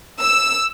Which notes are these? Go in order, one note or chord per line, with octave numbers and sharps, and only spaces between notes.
E6